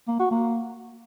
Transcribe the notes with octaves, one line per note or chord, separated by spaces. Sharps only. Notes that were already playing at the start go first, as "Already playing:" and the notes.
A#3
F#4
A#3